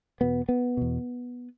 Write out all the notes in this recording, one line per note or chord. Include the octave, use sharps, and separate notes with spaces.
E2 B2 B3
B3
E2 B2